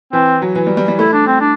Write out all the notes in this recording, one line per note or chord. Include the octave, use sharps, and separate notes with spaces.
E3 C4
F#3
E3
G3
G3
G3
A3 E4
D4
C4
D4